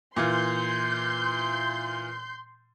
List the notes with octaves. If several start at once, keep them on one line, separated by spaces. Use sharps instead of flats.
A#2 E3 F4 C6 G6